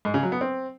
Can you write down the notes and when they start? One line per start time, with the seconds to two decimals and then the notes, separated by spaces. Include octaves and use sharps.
0.05 G#2
0.14 C#3
0.23 F#3
0.32 B3
0.41 C4